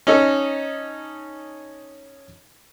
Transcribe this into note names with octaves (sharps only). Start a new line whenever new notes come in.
C#4 D#4 A4